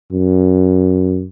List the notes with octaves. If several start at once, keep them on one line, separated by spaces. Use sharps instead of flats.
F#2